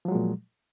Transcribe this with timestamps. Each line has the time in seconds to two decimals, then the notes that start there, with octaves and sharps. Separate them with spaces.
0.05 F3
0.08 F#3
0.12 G#3
0.15 A#2